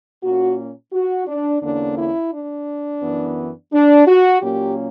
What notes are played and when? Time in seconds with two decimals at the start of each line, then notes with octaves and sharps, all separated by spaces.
0.22 A#2 A#3 C#4 F#4
0.93 F#4
1.27 D4
1.62 E2 D3 A#3 C#4 D4
1.98 E4
2.33 D4
3.02 F#2 E3 B3
3.73 D4
4.07 F#4
4.42 A#2 F#3 A#3 C#4 G4